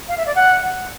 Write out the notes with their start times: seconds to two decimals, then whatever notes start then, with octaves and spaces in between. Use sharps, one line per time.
0.08 F5
0.17 E5
0.26 D5
0.35 F#5